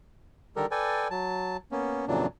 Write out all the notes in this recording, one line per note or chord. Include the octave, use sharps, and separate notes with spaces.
D3 D#3 G3 G4 A4 A#4
A4 B4 D5 G5 G#5
F#3 A5
A#3 B3 C#4
F2 A#2 C#3 E3 F#3 D4